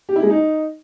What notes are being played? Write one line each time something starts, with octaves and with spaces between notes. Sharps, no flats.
G4
E4
G#3
D#4